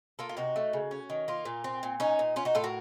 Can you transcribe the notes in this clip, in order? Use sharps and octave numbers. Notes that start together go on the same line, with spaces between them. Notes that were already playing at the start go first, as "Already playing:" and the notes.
A#3 F4 A4
F4
C3 D#4 F#4
A3
C#3
C#4
D#3
A#3 F4
A#2
C4
A#2
C#4 D#4
A#2
C#4 F4
D#4 F#4
A2 F4 A4
F#4 A#4